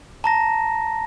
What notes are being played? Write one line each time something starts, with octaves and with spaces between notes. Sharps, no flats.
A5 A#5 A#6